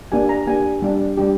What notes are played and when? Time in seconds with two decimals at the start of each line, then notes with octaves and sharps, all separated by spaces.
0.12 A#3 D4 G4 G#5
0.29 A#5
0.46 A#3 D4 G4 G#5
0.82 G3 D4 G4
1.17 G3 D4 G4